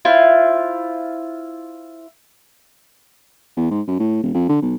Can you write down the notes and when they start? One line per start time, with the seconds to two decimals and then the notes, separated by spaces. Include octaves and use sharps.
0.05 E4 F4 C5
3.57 E2
3.71 G#2
3.87 F#2
3.99 A2
4.23 E1
4.34 F2
4.49 D3
4.62 B1